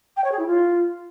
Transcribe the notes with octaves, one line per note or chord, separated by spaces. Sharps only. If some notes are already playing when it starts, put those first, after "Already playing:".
G5
C#5
G#4
E4
F4